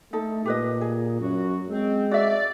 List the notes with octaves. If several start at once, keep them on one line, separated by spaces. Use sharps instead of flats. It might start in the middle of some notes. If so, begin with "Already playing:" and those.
A3 D#4 A4
A#2 G4 B4 D#5
G#4
F#2 F#4
G#3 C4
F#4 D5 E5